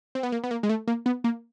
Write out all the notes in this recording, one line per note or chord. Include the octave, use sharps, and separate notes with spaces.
C4
B3
A#3
B3
A#3
G#3
A3
A#3
B3
A#3